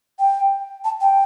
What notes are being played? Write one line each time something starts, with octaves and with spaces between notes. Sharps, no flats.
G5
A5
G5